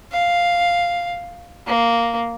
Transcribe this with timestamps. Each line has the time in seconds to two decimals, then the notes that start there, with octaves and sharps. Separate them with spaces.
0.12 F5
1.67 A#3